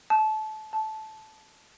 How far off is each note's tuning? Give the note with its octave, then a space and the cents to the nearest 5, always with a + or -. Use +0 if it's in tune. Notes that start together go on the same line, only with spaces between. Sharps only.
A5 -25
A5 -15